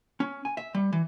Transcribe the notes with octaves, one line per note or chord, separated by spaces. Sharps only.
C#4
G#5
E5
G3
E3